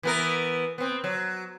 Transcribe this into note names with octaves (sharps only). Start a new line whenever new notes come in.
E3 B3 A#4
B3 C4
F#3